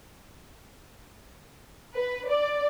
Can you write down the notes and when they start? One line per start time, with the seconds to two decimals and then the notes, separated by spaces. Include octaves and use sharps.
1.94 B4
2.29 D5